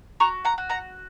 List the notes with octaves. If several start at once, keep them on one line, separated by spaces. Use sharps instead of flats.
F#4 A#5 C#6
F#5 A#5
F#4
F#5 A#5